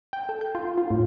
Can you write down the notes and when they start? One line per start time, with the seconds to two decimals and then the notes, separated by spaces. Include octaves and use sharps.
0.13 G5
0.29 A4
0.41 G6
0.55 F4
0.78 F4
0.90 A2